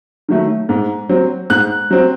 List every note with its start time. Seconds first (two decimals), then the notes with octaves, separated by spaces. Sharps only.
0.29 D#3 F#3 A3
0.69 G#2
1.09 F#3 C4
1.50 G#2 F#6
1.90 F#3 C4